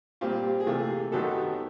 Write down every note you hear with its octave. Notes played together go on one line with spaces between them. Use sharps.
A#2 G3 C4 F4 G4
G#4
C3 E3 A3 F4 G4
F#2 D#3 F#3 B3 G4 A4